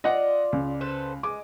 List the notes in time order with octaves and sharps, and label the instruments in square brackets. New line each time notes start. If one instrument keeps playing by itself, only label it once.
[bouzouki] F4 D5 [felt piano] D#5 F#5
[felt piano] C#2
[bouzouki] A4 B4 C5
[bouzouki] G#3 [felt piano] D6